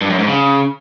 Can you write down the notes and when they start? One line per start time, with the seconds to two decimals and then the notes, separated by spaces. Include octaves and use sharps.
0.01 G2
0.10 F#2
0.19 G#2
0.28 C#3